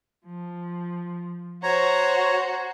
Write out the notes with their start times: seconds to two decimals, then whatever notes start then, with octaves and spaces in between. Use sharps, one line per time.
0.25 F3
1.63 F#4 C5 C#5 A#5